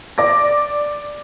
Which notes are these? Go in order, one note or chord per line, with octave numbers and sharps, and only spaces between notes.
D5 D6 A#6